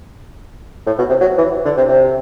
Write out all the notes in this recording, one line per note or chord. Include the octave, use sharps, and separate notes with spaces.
A2
B2
C3
F#3
E3
D3
C3
C3